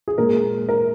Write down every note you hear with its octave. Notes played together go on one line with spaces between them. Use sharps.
G#4
A#2 G#3 A#4
A#4